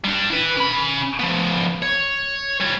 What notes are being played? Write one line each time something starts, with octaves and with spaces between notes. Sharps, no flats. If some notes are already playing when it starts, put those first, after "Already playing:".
G3 D4
E4 B4
C#4 B5
F3 B3
C#5
G3 C#5